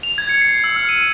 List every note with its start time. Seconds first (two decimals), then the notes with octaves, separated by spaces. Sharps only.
0.03 F7
0.18 G#6
0.29 C#7
0.41 C7
0.64 E6
0.76 F6
0.89 D#7